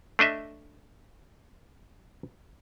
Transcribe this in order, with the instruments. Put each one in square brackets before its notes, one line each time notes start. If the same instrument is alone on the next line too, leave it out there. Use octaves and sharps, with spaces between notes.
[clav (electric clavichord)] A3 D4 D#5 E5